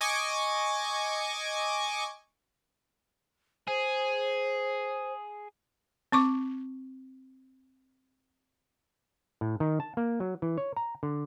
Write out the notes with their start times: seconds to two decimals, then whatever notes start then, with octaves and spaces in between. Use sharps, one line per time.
0.01 D#5 G#5 C#6 D6
3.68 G#4 C5
6.12 C4 C#6 D6
9.41 A2
9.60 D#3
9.80 A5
9.97 A#3
10.20 F#3
10.42 E3
10.58 C#5
10.77 A#5
11.03 D3